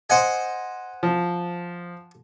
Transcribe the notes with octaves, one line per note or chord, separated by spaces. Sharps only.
C5 D#5 F#5 G#5
F3